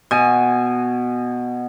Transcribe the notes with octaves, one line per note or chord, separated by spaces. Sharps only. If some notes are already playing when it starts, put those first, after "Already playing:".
B2 G#5